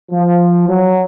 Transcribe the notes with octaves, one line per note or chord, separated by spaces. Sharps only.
F3
F#3